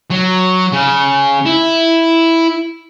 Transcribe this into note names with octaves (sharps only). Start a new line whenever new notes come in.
F#3
C#3
E4